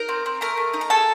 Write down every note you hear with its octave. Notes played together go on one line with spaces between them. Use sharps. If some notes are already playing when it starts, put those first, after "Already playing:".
Already playing: D#4 A#4 A#5
C4
C4
A3 A#4 A#5
A3
D#4
A#5
G#4 A4 A5